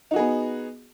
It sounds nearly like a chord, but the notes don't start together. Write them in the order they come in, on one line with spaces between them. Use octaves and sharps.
D#4 F#4 G#4 B3